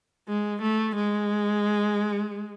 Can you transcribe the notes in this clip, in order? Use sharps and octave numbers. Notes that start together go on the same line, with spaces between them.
G#3
A3
G#3